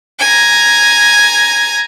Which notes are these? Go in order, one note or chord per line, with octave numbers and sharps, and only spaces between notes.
G#5 A#5